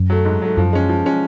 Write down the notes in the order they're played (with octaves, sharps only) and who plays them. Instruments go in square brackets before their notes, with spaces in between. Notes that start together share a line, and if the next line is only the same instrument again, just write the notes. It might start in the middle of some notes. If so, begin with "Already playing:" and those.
Already playing: [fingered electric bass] F#2
[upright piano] F#3 A3
G#2
F#3 A3
[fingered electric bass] F#2 [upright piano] F3
[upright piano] G#3 C#4
F3
G#3 C#4